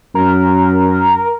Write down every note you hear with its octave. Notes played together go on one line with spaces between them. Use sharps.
F#2 A#4